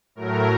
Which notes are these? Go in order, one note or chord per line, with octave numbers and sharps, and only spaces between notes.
A2 F#3 A3 A#4